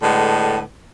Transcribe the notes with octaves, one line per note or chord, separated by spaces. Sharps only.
A2 D3 G#3 B3